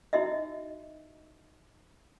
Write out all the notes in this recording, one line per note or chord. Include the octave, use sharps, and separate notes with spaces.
D#4 E4 F#4 D#5 E5